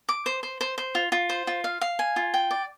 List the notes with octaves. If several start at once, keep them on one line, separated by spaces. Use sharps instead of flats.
D6
C5
C5
C5
C5
F4
F4
C5
F4
F5
F5
G#5
F4
G5
D5